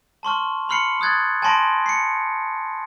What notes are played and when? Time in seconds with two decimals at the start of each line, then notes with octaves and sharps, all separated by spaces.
0.23 A5 C6 C#6 F6
0.69 B5 C6 F6 C7 C#7
1.00 C6 D#6 F#6 G#6 A6
1.42 G#5 A5 B5 C6 A#6 D7
1.86 C7 C#7